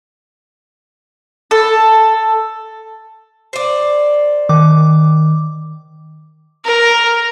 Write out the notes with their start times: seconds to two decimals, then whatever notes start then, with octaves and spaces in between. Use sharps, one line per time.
1.51 A4
3.53 C5 D5
4.49 D#3 D6
6.65 A#4